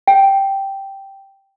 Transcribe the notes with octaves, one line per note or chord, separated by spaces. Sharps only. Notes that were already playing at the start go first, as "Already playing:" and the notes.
G5